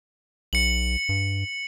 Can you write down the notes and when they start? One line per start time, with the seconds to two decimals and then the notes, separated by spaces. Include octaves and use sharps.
0.53 B1 C#7 F#7
1.09 G2